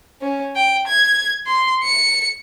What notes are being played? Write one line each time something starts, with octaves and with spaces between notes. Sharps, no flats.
C#4
G5
G#6
C6
C#7